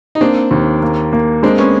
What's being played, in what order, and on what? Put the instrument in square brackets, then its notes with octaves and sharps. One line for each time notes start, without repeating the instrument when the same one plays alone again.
[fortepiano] D#4
[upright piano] A#3 [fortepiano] C4 D4
[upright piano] D#2
A#3
A#3
[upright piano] G#3 [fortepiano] C4 D4
[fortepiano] B3 C#4